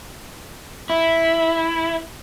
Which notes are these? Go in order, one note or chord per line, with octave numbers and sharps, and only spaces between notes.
E4